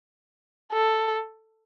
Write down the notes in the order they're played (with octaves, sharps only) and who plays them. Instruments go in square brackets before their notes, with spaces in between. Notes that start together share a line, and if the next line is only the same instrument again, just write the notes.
[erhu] A4